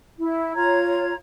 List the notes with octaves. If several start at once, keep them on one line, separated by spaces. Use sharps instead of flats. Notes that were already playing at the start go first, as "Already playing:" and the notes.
E4
F4 C#5 A#5 G#6